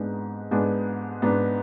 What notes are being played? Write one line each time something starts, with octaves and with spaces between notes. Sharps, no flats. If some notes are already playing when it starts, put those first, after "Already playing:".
Already playing: G#2 G#3 B3 D4
G#2 G#3 B3 D4
G#2 G#3 B3 D4